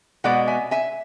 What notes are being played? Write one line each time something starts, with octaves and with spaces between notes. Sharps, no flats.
B2 G#3 B3 D5 F#5
E5 G#5
E5 G#5